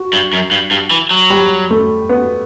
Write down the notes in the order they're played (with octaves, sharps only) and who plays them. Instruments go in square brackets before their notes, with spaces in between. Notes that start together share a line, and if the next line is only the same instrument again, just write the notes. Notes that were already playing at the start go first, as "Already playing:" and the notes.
Already playing: [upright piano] F#4
[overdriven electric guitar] G2
F#2
G2
G2
E3
F#3
[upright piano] G3
A3
B3